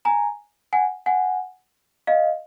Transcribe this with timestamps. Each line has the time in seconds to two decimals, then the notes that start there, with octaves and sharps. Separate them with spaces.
0.05 G#5 A#5
0.73 F#5 G#5
1.06 F#5 G#5
2.07 D#5 F5